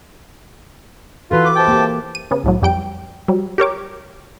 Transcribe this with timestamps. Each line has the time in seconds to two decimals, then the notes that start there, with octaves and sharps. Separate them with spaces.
1.31 E3 F4 F#4 A4 B4
1.45 D6
1.56 C3 G5 A5
1.68 A#3 G4
2.15 D#7
2.31 C#3 B3
2.44 C2 A2 F#3
2.62 F2 G3 G5 D7
3.28 F#3 G3
3.58 G4 A#4 C#5 D6